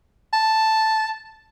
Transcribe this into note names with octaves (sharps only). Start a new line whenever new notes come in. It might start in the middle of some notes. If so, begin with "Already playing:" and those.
A5